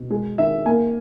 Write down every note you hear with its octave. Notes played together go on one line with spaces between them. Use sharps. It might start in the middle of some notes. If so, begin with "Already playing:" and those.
Already playing: B2
G#3 G#4
D#3 E5
A#3 G#5